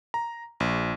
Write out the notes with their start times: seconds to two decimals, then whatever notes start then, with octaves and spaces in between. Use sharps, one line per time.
0.14 A#5
0.60 A#1